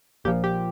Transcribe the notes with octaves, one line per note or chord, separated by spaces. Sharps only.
A#1 A#2 F3 G4
G4